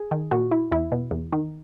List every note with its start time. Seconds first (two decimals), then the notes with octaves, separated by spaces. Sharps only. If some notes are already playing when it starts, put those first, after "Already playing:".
Already playing: G#4
0.11 D#3
0.31 A#2 F#4
0.51 E4
0.72 E2 E4
0.92 B2
1.11 E2
1.32 D#3